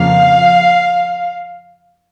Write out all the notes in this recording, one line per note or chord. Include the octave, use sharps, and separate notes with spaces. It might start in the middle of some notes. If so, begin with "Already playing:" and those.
Already playing: F2 C#3 F3 A#3 F5